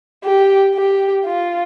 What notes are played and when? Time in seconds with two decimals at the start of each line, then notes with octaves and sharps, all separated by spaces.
0.24 G4
0.75 G4
1.26 F4